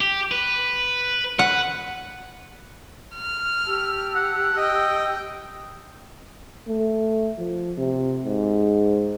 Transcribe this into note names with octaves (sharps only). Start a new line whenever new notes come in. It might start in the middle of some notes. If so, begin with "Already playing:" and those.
G4
B4
B4 F#5
F6
G4 A5 E6
F#5
D#5 G5
A3
F3
C3
G#2